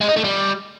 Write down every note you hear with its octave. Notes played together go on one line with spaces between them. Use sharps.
G#3
D#4
A3
G3